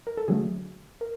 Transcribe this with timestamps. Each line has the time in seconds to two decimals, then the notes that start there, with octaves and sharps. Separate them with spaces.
0.07 A#4
0.17 A4
0.28 D3 F#3 A3 G#4
1.01 A#4